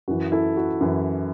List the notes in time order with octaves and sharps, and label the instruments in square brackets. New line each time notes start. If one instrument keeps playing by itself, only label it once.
[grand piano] F#2 E3 F#4
E4 A4
F#4
F#2 E3